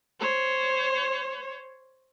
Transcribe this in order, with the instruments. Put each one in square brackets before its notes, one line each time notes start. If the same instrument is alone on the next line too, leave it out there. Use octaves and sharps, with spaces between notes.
[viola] C5 C#5